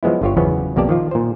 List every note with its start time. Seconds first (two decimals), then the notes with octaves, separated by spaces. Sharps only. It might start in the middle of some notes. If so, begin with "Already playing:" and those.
0.03 F3 F#3 G#3 B3 E4
0.22 G1 D3 F4 G4 C#5
0.37 E2 C#3 F3 F#3 B3 C#4
0.76 B1 F2 A#3 G4 D5 A5
0.89 D#3 F3 F4
1.11 A#2 C5